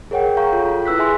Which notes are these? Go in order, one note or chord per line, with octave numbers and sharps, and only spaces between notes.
G#4 A#4 C#5 F#5 G5
F5 A#5 C#6 G6
F4 A4
E4 B4 E6 F#6 B6
E4 G#4 E5 G#5 C6